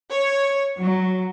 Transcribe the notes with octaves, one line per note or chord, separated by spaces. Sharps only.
C#5
F#3